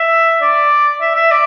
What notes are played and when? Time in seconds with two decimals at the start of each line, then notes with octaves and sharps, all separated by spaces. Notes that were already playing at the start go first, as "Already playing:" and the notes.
Already playing: E5
0.41 D5
1.01 E5
1.15 E5
1.31 D5